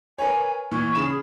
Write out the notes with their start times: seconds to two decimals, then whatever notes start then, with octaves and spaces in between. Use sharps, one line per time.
0.18 A#4 B4 C#5 G#5
0.71 A#2 E3 C#6
0.95 C#3 G#4 B5 E7